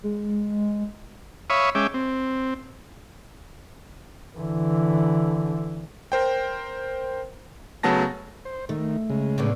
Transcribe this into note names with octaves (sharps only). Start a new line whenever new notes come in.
G#3
C#5 E5 F5 B5 C#6 D#6
G#3 C#4 E5 G5 D6
C4
D3 E3
A#4 C5 G5
C#3 F#3 A3 B3 A5 A#6
C5
D#3 A3
C#3 G#3
A2 D3 B3